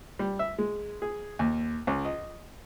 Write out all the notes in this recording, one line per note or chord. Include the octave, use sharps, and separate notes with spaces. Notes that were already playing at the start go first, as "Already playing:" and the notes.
G3
E5
G#3
G#4
D#2
C#2
D#5